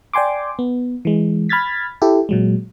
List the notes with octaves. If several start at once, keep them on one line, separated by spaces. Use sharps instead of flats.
D5 G5 G#5 C6 D6
B3
E3 G#3
B5 F6 G#6 A6 B6
E4 G4 A4
A#2 F#3 G#3